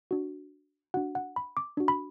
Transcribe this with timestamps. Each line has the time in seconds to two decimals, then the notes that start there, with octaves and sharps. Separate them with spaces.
0.11 D4 F#4
0.94 D4 F#4 F#5
1.15 F#5
1.36 B5
1.57 D6
1.77 D4 F#4
1.88 B5